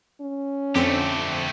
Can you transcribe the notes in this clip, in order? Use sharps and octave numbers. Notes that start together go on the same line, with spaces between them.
C#4
F2 D3 A3 C4 G4